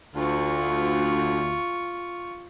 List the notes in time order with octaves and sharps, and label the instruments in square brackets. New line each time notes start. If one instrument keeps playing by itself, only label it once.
[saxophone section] D2 [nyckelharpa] F4 C#6